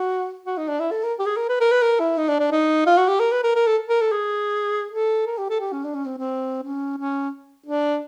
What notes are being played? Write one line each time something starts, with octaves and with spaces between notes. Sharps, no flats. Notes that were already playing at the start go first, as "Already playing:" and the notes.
Already playing: F#4
F#4
D#4
D4
E4
A4
A#4
G4
G#4
A#4
B4
A#4
B4
A#4
E4
D#4
D4
D4
D#4
F4
F#4
G4
A#4
B4
A#4
A#4
A4
A#4
A4
G#4
A4
A#4
G4
A4
G4
C#4
D4
C#4
C4
C4
C#4
C#4
D4